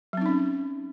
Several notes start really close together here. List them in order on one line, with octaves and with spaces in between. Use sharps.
F#3 C4 D#4 C#4